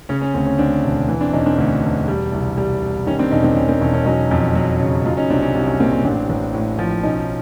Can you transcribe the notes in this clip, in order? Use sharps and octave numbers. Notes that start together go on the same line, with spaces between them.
C#3 C#4
C#4
D2 C4
C#4
D2 C4 D4
E1
E3
C4 D4
E1 C#4 D#4
C4 D4
D2 C#4
E1
G3
C2
G3
C2
D#3 C#4
C4 D4
E1 C#4 D#4
C4 D4
E1 C#4
C4
E1 C#4
C#4
F#3 C#4 D#4
F2
F#3
C#3
F#3 D#4 F4
C#4 D#4
C2 C4 D4
C#4
C2 C4
C#4
A#2 C4
C#4
A1 C4 D4
A1
A2
F3
B1 C#4 D#4